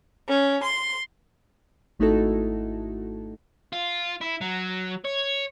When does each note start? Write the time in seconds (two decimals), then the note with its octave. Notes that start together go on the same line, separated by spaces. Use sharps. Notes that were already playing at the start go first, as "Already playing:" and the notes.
0.27 C#4
0.62 C6
1.99 G#1 A3 D#4 E4 F#4 A4
3.73 F4
4.21 E4
4.41 F#3
5.05 C#5